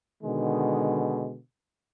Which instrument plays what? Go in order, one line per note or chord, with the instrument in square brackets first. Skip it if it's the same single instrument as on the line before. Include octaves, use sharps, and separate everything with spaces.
[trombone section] B2 D3 D#3 G#3